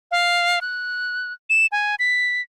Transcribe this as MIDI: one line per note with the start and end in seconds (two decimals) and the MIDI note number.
0.11 0.59 77
0.61 1.33 90
1.50 1.66 100
1.72 1.95 80
1.99 2.41 95